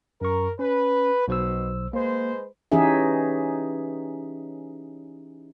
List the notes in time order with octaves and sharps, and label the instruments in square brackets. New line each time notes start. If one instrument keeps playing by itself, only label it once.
[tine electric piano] F#2 C#6 [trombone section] A#4
[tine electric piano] C#4 [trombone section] B4
[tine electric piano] B1 C5 E6 [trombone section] B2
[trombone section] G#3 B4 C5 [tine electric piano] A#3
[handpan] E3 C#4 D#4 G4 G#4 E5